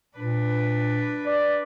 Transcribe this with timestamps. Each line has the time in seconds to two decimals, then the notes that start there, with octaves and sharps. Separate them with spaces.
0.17 A#2 D4 B4
1.27 D5